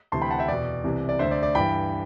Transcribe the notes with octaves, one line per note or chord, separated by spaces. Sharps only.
D2 C3 E3 A5 C6
G5 B5
F#5 A5
E5 G5
E2 B2 D5
C2 C3 E3
D5
D2 D3 C5 E5
D5
D5
G2 E3 G5 B5